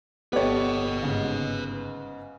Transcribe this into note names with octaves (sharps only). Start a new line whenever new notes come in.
G1 B3 G4 A4 B4 C#5 D#5
G#2 C#3